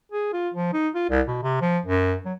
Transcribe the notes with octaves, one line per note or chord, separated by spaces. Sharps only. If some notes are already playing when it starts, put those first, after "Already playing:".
G#4
F4
F3
D#4
F4
C2
B2
C3
F3
F#2
F#3